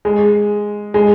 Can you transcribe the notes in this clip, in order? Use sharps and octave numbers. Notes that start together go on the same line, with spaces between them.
G#3
G#3